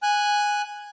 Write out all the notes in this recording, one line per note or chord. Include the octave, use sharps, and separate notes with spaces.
G#5 F#6